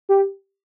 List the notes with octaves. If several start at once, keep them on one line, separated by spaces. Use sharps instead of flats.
G4